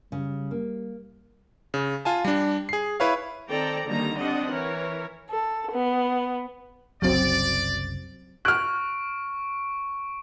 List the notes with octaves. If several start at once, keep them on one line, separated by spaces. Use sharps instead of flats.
C#3 G3
A#3
C#3
F4 G#5 A5
G3 D4
G#4 C7
E4 B4 C#5 F5
D#3 C4 A4 D5 G5 A#5
D3 D#3 G3 A#3 D#4 A#5
G3 C4 D4 D#5 F#5
E3 A#4 C#5
A4
B3
F#1 C2 C#3 F#3 C4 D5
C#6 F6 F#6 D7